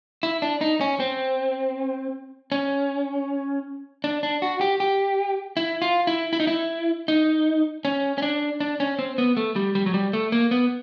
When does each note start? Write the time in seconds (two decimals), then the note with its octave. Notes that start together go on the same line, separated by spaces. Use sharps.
0.23 E4
0.42 D4
0.61 D#4
0.81 C#4
1.00 C4
2.52 C#4
4.04 D4
4.23 D4
4.42 F#4
4.61 G4
4.80 G4
5.57 E4
5.82 F4
6.07 E4
6.33 E4
6.40 D#4
6.47 E4
7.08 D#4
7.85 C#4
8.18 C#4
8.22 D4
8.60 D4
8.80 C#4
8.99 C4
9.18 B3
9.37 A3
9.56 G3
9.75 G3
9.86 F#3
9.94 G3
10.13 A3
10.32 A#3
10.51 B3